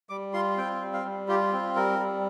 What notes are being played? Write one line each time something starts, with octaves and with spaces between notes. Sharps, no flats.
G3 D6
F4 C6
C4 G5
G3
F5
G3
F4 G4
C4
G3 A#4
G3